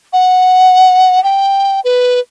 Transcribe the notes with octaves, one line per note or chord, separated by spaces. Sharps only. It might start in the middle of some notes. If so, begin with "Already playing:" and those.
F#5
G5
B4